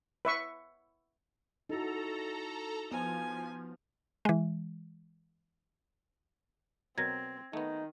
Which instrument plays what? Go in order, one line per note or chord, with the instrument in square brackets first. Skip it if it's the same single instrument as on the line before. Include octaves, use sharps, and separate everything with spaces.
[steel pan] B4 E5 C#6
[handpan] D#4 E4 F#4 [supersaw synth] A4 A#5
[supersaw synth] F3 [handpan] B3 [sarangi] G#5
[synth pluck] E3 G#3
[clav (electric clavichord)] B2 F#3 A#4 [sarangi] C4 [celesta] G#6 A#6
[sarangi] D#3 [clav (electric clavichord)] A3 B3 [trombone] D#4